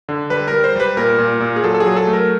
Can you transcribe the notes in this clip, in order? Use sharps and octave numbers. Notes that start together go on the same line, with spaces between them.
D3
G3 B4
G3 A#4
C5
G3 B4
A#2 A#4
A#2
A#2
G#4
F#3 A4
A4
G#4
F#3
A4
A3
A#4